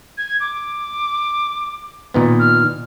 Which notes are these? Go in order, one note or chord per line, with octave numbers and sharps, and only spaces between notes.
G#6
D6
A#2 D#3 B3
F6